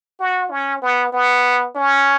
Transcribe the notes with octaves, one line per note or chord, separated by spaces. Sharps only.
F#4
C#4
B3
B3
C#4